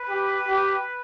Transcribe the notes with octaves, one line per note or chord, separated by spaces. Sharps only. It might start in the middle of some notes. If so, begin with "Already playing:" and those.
Already playing: B4
G4
G4